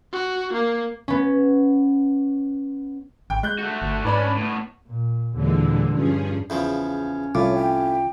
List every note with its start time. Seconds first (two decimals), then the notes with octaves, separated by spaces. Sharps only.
0.13 F#4
0.53 A#3
1.08 B3 C#4
3.30 G#1 G5
3.43 G#3 F#6 G6
3.58 A3 F#4
3.82 G1
4.05 G#2 C#4 D4 B4 D5 B5
4.37 A2 B3
4.87 A#2
5.35 D#2 A#2 D3 E3 G#3
5.93 G2 F3 C#4 G#4
6.50 E2 C#3 F3 C#4
7.35 C2 A2 F4 C#5 D6
7.55 G5